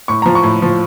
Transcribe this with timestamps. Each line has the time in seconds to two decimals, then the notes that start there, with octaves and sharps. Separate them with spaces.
0.08 A2 C#6
0.22 F3 A#5
0.35 C#6
0.43 A2
0.62 F3